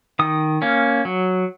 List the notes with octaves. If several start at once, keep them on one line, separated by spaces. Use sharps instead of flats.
D#3 D#6
A#3 C#4
F#3